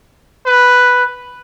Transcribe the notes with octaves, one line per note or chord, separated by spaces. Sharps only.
B4